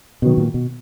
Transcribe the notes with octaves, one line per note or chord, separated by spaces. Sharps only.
B2 D#3 F#3 B3
A#2
B2